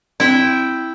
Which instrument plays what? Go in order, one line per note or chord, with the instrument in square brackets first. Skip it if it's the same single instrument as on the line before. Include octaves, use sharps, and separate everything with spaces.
[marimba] C4 [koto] E4 G5